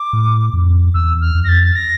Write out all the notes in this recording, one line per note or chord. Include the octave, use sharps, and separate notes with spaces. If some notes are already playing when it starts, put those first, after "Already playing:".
Already playing: D6
A2
F2
E2 E6
F6
F2
A#6
A6
A6
A#6